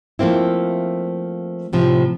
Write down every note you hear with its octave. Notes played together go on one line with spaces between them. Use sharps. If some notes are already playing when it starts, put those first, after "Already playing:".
F3 A3 A#3 C4 E4
A2 C3 F3